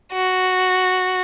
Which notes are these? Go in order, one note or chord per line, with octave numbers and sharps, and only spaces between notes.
F#4